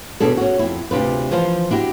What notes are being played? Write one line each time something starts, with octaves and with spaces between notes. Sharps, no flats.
D#2 B2 D4 G#4 A4
C#4 F#4
F2 E4
D2 C3 D4 F4 B4
E3 F3 F4 C5 F5
D4 E4 F#4 G4